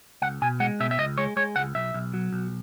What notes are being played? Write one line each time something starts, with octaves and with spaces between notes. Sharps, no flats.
C#2 F#5
B2 G#5
G#3 F#5
B2 E5
E5
C#2 D#5
G#3 C#5
G#3 C#5
C#2 F#5
B1 E5
B1
F#3
B1